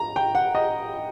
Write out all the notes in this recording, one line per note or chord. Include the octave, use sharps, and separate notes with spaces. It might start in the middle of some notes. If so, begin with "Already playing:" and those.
Already playing: A#5
G5
F#5
D#5